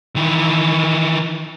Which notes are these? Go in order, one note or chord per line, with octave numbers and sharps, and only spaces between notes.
D#3 E3